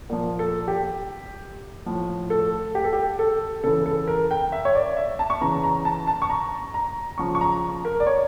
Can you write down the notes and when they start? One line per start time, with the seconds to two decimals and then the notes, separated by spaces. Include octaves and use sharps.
0.09 A#2 F3
0.39 A4
0.68 G4
1.86 A2 F3
2.30 A4
2.75 G4
2.84 A4
2.93 G4
3.19 A4
3.64 C#3 E3 A4
3.86 A4
4.08 A#4
4.31 G5
4.52 E5
4.65 C#5
4.75 D5
4.97 E5
5.19 A5
5.30 C#6
5.41 C#3 E3 A#5
5.63 A#5
5.85 A5
6.07 A5
6.22 C#6
6.30 A#5
6.74 A#5
7.18 C#3 F3 C#6
7.35 C#6
7.41 A#5
7.85 A#4
8.00 D5
8.07 C#5